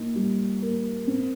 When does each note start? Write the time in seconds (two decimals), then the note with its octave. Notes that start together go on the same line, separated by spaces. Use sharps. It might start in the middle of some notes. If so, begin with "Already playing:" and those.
Already playing: A#2 D#4
0.15 G3
0.62 A#3
1.07 C4